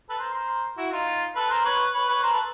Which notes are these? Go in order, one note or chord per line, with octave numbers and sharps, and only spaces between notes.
A4 B4
A#4 C5
A#4 C5
E4 F#4
D#4 F4
A4 B4
A#4 C5
B4 C#5
B4 C#5
B4 C#5
A#4 C5
A4 B4